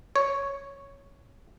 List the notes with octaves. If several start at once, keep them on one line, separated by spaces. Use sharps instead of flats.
C#5